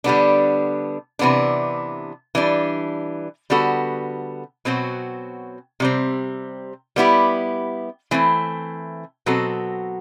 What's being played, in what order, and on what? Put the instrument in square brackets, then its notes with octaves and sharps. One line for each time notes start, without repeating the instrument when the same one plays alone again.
[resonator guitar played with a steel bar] D3 G3 B3 D4
C3 E3 B3 D4
E3 G3 D4
D3 G3 B3 F#4 A4
B2 F#3 C4 F#4
C3 G3 C4
G3 B3 E4 G4
E3 A3 C4 E4
B2 F#3 C4 F#4 A4